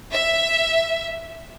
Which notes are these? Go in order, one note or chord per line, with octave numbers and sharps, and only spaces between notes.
E5